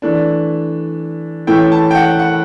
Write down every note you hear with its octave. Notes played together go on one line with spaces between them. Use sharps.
E3 A3 D4
A2 E3 A3 C#4 E4 G5
A5
G5
F#5
F#5